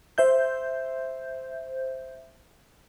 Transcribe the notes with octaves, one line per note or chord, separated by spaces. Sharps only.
C5 E5 G6